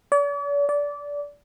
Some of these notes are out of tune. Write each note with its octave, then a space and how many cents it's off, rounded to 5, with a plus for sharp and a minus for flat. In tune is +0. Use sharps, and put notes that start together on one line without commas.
D5 -45
D5 -20